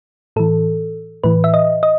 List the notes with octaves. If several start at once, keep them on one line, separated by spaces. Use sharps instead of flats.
A2 E3 A4
A2 E3 B4
E5
D#5
D#5